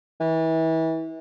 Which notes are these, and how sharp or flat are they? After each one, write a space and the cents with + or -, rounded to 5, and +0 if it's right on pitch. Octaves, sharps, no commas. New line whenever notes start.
E3 -30